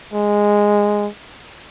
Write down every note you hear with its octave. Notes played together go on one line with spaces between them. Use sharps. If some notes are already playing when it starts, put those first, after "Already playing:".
G#3